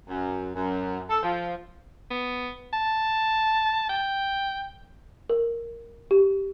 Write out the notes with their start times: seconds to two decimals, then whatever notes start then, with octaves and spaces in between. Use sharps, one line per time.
0.08 F#2
0.55 F#2
1.09 A4
1.22 F3
2.11 B3
2.73 A5
3.89 G5
5.30 A#4
6.11 G4